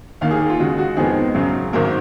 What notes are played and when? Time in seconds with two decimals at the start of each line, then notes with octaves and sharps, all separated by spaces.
0.21 D#2 D#3 A#3 F5
0.31 G#4
0.41 G#4
0.50 F4
0.59 D#2 C#3 G#3 F#4
0.78 F#4
0.97 F2 D#3 G#3 B3 G#4
1.34 G#1 F#2 C#3 F#3
1.73 G#1 G#2 F#3 A#3 A#4